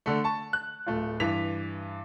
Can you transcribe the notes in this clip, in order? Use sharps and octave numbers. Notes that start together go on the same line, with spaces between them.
D3 A3
A5 C#6
F#6
D1 A3 F4
G2 E3 B6 F7